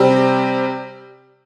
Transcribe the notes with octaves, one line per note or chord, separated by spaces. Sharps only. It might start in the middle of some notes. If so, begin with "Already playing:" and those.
Already playing: C3 G3 C4 G4